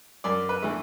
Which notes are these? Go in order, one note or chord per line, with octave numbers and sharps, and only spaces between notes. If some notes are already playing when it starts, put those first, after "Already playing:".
F#2 D5
B4
E3 A3